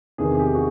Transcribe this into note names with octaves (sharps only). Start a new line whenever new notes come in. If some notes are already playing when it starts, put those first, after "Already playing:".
E2 C3 D#3 G#4
G#4
G4
F#4